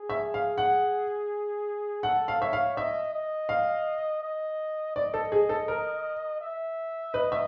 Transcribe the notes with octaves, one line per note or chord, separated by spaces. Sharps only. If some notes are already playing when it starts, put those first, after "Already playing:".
Already playing: G#4
E5
F5
F#5
A4 F#5
F5
C#5 E5
F5
D#5 E5
D#5
F5
D#5
D5 D#5
A4
G#4
A4
A#4
E5
B4 D#5
E5